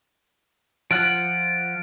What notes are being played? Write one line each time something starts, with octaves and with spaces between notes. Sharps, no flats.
F3 F4 F#5 D7